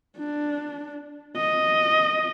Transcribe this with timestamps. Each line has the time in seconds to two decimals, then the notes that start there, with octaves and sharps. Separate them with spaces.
0.17 D4
1.36 D#5